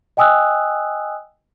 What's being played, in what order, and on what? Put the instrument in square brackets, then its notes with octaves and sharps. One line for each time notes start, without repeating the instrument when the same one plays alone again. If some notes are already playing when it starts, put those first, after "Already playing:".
[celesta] D#5 G5 G#5 D#6 E6 F#6